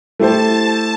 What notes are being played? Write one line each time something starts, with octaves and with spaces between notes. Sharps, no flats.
A3 E4 G4 C5 A5